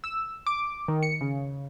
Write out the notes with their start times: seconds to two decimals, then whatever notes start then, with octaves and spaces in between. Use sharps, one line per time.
0.04 E6
0.47 D6
0.88 D#3
1.03 C#7
1.21 C#3